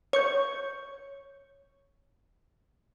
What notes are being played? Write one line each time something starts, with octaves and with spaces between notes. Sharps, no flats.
C#5 C#6 G6